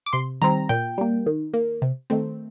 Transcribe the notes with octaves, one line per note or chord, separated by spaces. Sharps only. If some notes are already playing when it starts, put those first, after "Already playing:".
D6
C3 C6
D#3 G3 C4 A#5
A#2 G5
G3 A#3
D#3
A#3
C3
D#3 A3 C4